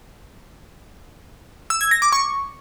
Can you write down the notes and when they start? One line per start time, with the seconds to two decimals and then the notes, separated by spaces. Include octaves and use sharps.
1.70 E6
1.81 G#6
1.91 A#6
2.02 D6
2.12 C#6